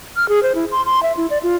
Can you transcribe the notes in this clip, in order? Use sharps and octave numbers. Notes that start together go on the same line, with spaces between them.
F6
G#4
C5
E4
C6
C6
E5
E4
D5
F4